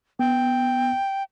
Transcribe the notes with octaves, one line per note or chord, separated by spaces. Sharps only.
B3 G5